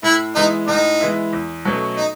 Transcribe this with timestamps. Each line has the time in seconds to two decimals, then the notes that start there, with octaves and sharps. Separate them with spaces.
0.03 A2 E4
0.35 E3 G#3 B3 D#4 E4
0.68 A2 D#4
1.00 E3 G#3 B3 E4
1.33 E2
1.65 B2 F#3 A3 C#4
1.97 D#4